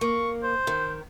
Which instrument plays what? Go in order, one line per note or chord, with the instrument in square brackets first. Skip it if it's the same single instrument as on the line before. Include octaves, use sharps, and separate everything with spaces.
[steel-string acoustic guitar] A#3 [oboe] C#6
[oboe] C5
[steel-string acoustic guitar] D#3